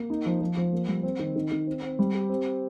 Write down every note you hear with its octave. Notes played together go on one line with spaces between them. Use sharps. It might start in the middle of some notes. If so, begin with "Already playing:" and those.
Already playing: A#3
D#4
F3
F3
F3
A#3
G3
C4
D#3
D#3
D#3
C4
C4
G3
G4
C4